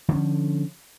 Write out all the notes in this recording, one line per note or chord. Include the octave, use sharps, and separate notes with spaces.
D3 F3 C#4